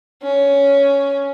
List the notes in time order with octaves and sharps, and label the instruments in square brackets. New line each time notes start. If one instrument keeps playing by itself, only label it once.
[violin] C#4